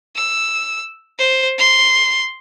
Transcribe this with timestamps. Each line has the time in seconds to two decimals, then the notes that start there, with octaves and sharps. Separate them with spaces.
0.16 E6
1.19 C5
1.59 C6